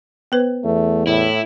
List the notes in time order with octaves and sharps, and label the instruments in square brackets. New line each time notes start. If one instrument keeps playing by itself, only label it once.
[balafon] B3 B4 C5
[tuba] E2 [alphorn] A3
[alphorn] A2 [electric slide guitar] E4